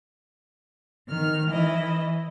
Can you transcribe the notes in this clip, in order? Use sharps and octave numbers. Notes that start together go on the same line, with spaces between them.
D#3 F6
E3 E4 D#5